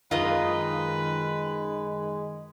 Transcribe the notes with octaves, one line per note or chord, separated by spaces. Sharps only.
F#2 D#3 G#3 F4 A#4 B4 D#5